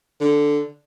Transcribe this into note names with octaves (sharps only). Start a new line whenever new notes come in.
D3